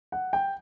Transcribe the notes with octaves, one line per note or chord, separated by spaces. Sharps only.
F#5
G5